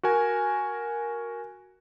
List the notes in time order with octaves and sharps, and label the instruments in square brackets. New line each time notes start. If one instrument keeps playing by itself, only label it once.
[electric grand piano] F#4 A#4 G#5